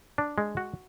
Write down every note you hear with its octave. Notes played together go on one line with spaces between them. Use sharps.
D4
G#3
F#4